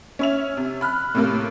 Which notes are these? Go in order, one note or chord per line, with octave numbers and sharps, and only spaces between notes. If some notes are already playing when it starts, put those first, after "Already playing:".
C#4 E5 F7
C3
B5 F6 F#6
A2 C3 A#3